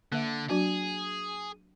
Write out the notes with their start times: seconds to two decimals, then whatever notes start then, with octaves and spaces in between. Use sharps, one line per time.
0.12 D3 A#3 E5
0.50 F#3 D4 F#4 G#4